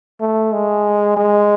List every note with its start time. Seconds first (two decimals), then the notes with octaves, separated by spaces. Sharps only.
0.21 A3
0.53 G#3
1.17 G#3